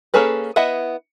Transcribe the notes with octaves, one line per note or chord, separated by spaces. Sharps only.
A#3 C#4 G#4 A4 B4
B3 E4 D#5 E5 F#5